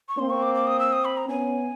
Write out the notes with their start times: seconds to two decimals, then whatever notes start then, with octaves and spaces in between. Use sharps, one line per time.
0.09 C#6
0.18 A#3 C4 C6
0.30 C#6
0.42 D6
0.55 D6
0.67 D#6
0.80 E6
0.93 D#6
1.05 B5
1.17 A#5
1.29 B3 C#4 G#5